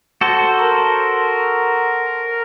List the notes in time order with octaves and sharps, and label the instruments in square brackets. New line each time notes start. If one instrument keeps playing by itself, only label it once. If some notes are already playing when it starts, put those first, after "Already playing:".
[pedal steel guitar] F#4 A4 C5
[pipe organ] A#4